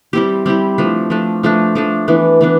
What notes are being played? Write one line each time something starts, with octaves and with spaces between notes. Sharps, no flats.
G3 C4 E4 G4
G3 C4 E4 G4
F3 A3 D4
F3 A3 D4
F3 A3 D4
F3 A3 D4
E3 B3 D4
E3 B3 D4